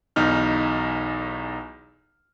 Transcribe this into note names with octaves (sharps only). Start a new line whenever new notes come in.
B1 E2 D#4 F6